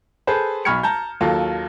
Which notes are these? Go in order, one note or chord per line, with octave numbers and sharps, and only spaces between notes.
G#4 A4 B4 C5
B1 B5 C#6 F6 G#6 C#7
A5 A#5 G6
D#2 F#3 F4 A4